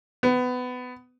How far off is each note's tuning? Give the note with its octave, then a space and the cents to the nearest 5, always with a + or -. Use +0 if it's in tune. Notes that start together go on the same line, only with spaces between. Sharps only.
B3 +20